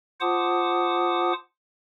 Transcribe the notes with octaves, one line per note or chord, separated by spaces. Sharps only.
F4 C5 F#5 A5 D6 D#6